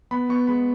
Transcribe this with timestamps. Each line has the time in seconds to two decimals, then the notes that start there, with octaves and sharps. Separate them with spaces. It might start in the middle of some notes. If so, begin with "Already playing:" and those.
0.11 B3 B5
0.29 B3 C#6
0.47 G#3 B5